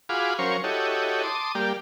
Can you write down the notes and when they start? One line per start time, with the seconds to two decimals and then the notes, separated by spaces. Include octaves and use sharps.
0.09 F4 F#4 G#4 F5 B5 D6
0.39 F#3 C#4 A#4 C5 F5 C#6
0.64 E4 F#4 G4 A4 C#5 D#5
1.23 A5 C6 D6 D#6
1.55 G3 A#3 G4 D5